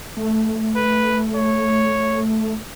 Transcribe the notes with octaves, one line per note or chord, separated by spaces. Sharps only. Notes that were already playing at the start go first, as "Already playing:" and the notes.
A3
B4
C#5